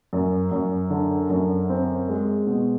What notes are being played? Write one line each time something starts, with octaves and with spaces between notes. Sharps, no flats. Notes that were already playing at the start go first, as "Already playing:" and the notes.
F#2
F#2
D3
F#2
C4
G#3
B2